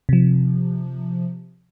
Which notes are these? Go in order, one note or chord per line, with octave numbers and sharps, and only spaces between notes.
C3 F3